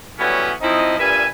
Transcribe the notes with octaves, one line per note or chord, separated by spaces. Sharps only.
E3 F#3 G3 A3 B3 C#4
F3 C4 D#4 E4 D#5
G2 A#2 G3 B4 E5 G#5